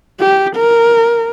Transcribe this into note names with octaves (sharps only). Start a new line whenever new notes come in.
G4
A#4